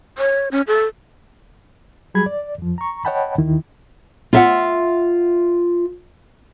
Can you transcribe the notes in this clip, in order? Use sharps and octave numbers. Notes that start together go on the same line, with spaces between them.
C#5
C#4
A4
F#3 G3 G#4 B5 G#6
D5
F2 F3
A#5 C#6
C#5 D#5 F#5 G5 A5 B5
D#2 D#3 E4
F4 E5 F#5